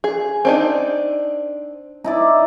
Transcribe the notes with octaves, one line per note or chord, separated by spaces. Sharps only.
G#4
C4 D4 D#4
D#4 E4 D5